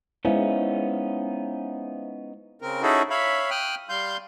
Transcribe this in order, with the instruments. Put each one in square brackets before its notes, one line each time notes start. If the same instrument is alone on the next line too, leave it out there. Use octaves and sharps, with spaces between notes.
[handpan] G#3 E4 [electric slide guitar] B3 C#4 D#4 [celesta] C5 E5 F5
[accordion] C#3 C4 A#4
C#4 D#4 E4 F#4 G#4 A4
C#5 E5 F5 B5
G5 D#6 F6 F#6
G3 F5 C6 G6